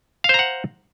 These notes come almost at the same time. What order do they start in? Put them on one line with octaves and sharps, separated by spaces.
F5 C5 A#5 F#5